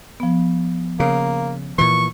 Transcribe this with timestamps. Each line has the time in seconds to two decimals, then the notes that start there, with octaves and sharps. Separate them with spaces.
0.20 F3 B3
1.00 C#3 A#3
1.78 A#2 E3 C#6